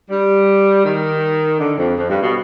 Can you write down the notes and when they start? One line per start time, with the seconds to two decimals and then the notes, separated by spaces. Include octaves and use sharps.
0.10 G3
0.85 D#3
1.60 D3
1.78 F2
1.97 F2
2.09 G2
2.22 B2